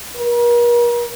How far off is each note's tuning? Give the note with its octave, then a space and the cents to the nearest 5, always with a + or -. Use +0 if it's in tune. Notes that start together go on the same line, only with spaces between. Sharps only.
A#4 +40